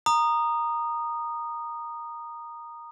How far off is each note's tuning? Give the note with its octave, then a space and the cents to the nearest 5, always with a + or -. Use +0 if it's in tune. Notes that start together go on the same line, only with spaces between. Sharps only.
A#5 +0 D#6 -15